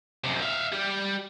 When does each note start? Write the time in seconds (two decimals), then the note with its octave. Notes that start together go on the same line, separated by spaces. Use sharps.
0.24 F#2 C3
0.41 E5 F5
0.72 G3 G4